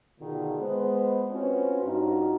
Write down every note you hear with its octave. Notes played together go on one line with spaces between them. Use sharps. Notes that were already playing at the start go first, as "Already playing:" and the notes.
B2 D3 D#3 F4 G#4
G#3 B3 C5
C4 C#4 F4 F#4 B4 C5
G2 D#4 F4 F#4